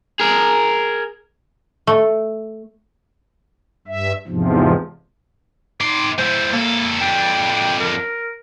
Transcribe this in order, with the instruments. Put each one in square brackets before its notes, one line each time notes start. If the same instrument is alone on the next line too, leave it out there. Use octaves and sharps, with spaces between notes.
[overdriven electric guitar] G#4 A#4
[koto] A3
[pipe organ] G2 E5
E2 G#2 C3 F3
[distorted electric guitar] D#3 C6 [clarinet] D6
[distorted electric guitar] G#3 E4 [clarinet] C5
[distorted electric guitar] A#2 A4 [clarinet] A#3
[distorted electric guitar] F2 D4 [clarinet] G5
[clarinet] A#4